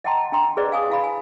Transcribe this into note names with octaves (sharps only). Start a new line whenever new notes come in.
D#5 F#5 G5 A5 A#5 C6
D4 G5 A#5 C6
G#4 B4 C5 D5 D#5
F5 G#5 D#6
E4 F5 B5
G#5